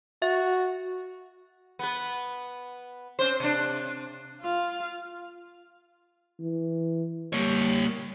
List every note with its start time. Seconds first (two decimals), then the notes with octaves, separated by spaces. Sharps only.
0.22 F#4 E5
1.79 B3 B4
3.19 C4 C#4 C5
3.40 C3 D4
4.41 F4 F5
6.39 E3
7.33 G3 A#3 C#5